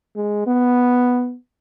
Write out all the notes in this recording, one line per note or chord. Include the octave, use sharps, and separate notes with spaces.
G#3
B3